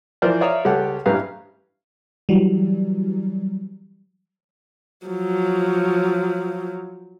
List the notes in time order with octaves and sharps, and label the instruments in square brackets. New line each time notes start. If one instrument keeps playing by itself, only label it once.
[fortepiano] E3 F3 F4 A#4 C5 D5
C#5 D5 E5 F5 A#5 D#6
C#2 G3 G4 A4 C#5 F#5
A1 G2 G3 B4 F5 A#5
[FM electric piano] E3 F#3 G3
[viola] F3 F#3